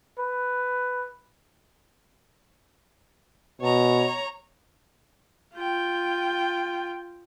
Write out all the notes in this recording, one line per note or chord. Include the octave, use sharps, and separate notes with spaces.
B4
B2 C#5 A#5
F4 G5